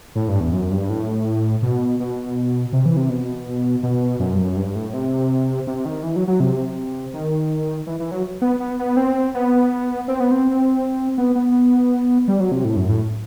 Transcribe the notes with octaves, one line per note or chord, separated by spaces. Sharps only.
A2
G2
E2
F#2
G2
A2
B2
B2
C3
E3
C3
B2
B2
F#2
G2
F#2
G2
A2
C3
C3
D#3
E3
F#3
F#3
C3
D#3
E3
E3
F#3
B3
B3
B3
C4
B3
C4
B3
C4
B3
B3
G3
F#3
C3
A2
F#2
A2